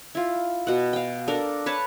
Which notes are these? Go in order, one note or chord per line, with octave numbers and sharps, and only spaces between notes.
E4 F4
B2 F#5
F5 G5
D4 A4 A#4
B4 C#5 A5